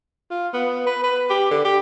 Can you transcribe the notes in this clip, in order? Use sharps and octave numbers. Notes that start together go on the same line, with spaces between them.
F4
B3
B4
B4
G4
D3
G4